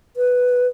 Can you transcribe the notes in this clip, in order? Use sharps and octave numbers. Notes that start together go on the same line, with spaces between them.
B4